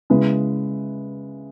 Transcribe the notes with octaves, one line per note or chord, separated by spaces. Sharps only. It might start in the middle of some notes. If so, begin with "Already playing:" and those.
C#3 G#3 E4 B4